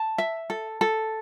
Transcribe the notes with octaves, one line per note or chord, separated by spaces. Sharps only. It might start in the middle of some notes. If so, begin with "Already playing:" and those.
Already playing: A5
E5
A4
A4